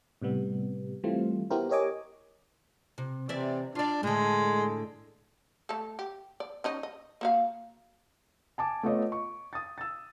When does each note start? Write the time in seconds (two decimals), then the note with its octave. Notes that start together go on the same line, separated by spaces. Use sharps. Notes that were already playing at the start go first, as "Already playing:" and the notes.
0.22 A2 C3 G3 B3
1.04 E3 G3 A3 C4 F4
1.50 B3 E4 F#4 G4 A#4 C5
1.69 G4 A#4 C#5 D#5 G#5 D6
2.98 C3
3.29 C3 E3 D5 E5
3.75 D4 F4 D5
4.03 A2 D3 G#3
5.69 A3 A4
5.99 G4
6.40 D5
6.64 C#4 D#4 D#5
6.83 D#5
7.21 A#3 F#4 F5
8.58 G#5 A5 D6
8.83 A3 B3 F4 C#5 D#5
9.12 C#6
9.53 D#6 A6
9.78 E6 A6